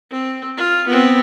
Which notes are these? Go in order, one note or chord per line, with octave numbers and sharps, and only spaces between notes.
C4
F4
B3 C4